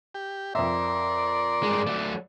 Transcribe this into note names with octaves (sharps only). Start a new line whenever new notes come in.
G4
F2 A#4 D5 E5 C6
G2 G#3
F#3 A3